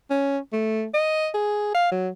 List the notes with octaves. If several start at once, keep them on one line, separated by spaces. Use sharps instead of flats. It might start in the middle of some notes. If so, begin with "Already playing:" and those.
C#4
A3
D#5
G#4
F5
F#3